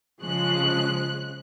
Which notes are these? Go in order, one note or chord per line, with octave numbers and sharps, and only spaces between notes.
C#3 F3 G#3 F#6